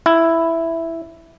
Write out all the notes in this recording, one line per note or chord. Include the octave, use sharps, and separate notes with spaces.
E4